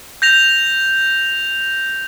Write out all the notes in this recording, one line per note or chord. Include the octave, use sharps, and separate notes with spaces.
G6 A#6 F7